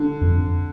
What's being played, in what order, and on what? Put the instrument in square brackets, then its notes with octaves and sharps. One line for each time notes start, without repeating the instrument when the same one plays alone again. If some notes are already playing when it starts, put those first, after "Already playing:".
Already playing: [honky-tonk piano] D3
[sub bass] F2